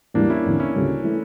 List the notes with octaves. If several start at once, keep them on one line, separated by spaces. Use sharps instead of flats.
E2 E3 G3 A#3 D4
C#4 E4
F1 E2 D3
C#4 E4
D2 C#3 G3
E3 A3